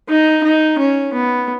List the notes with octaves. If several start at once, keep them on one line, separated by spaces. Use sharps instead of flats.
D#4
D#4
C#4
B3